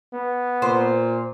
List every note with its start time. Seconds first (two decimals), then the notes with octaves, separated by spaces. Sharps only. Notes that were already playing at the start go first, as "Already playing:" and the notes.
0.13 B3
0.62 A#2 C5